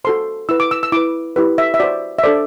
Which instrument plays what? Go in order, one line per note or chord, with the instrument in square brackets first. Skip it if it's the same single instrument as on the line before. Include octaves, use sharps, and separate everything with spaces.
[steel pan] F#4 A4 C5 C6
E4 B4 E6
D6
E6
E6
E4 B4 D6
E4 G4 B4
E5
E5
F#4 C5 D5
E5
D4 A4 C5 D5